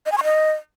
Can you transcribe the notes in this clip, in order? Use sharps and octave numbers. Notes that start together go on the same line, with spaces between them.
D#5
G#5
C#6
D#5